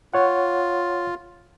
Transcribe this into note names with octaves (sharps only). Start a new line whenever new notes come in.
F4 C#5 F#5